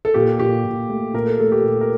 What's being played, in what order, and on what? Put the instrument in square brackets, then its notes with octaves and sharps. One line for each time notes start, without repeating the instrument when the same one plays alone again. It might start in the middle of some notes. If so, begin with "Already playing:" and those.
[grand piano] A4
A#2 G4
A#2 G4
A#2
A3
A#2 A#4
A4
A3 A4
G4
A#2
A#4